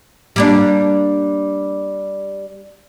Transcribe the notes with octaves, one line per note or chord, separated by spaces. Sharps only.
G3 A#3 D4